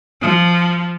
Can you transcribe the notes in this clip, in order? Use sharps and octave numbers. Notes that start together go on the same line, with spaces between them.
F3